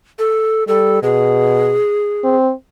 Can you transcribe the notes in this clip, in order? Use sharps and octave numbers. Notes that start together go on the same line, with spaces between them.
A4
G3 A4
B2 G#4
C4